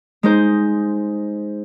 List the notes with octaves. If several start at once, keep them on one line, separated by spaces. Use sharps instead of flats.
G#3 D#4 C5